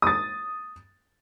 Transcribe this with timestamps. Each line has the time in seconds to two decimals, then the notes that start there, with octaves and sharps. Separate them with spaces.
0.02 D#6 A6